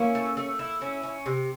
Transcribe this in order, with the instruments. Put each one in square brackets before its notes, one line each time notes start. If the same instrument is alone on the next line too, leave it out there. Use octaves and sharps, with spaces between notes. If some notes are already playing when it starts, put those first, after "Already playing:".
Already playing: [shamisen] A#3 [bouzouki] C#4 E4
[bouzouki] A3
A3
E4
C#4
C#4
C3